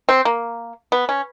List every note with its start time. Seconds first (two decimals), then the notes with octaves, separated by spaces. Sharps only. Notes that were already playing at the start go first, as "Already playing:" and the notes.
0.09 C4
0.25 A#3
0.92 B3
1.09 C#4